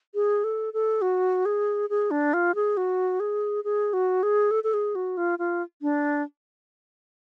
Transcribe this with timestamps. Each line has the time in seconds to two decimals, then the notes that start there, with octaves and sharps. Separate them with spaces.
0.15 G#4
0.44 A4
0.74 A4
1.02 F#4
1.45 G#4
1.90 G#4
2.11 D4
2.34 F4
2.55 G#4
2.77 F#4
3.20 G#4
3.64 G#4
3.93 F#4
4.23 G#4
4.51 A4
4.64 A4
4.74 G#4
4.95 F#4
5.17 F4
5.39 F4
5.82 D4